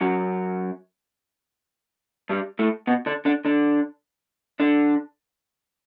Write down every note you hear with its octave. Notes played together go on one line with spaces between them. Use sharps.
F#2 F#3
G2 G3
A2 A3
B2 B3
D3 D4
D3 D4
D3 D4
D3 D4